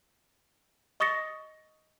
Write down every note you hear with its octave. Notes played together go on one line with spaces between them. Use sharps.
D#5 C#6 D#6 A6 A#6 C#7